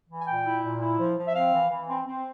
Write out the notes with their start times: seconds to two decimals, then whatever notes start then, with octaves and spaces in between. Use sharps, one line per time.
0.08 E3
0.21 G#5
0.26 A#2 G5
0.44 E4
0.62 A#2
0.80 E4
0.98 F3
1.16 F3
1.26 E5
1.34 C4 F5
1.52 E3
1.70 E3
1.87 C4
2.05 C4